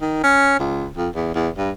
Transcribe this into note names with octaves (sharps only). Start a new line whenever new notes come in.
D#3
C#4
C#2
F2
E2
E2
G2